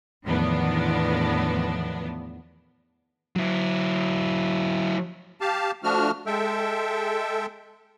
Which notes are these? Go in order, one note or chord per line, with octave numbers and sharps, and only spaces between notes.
E2 A2 D#3 F3 B3 D4
F#3 E4
G4 F5 A5
F3 A3 D4 F#4 F6
G#3 A4 E5 G5